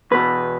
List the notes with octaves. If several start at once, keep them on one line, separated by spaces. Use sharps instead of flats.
E2 B2 B4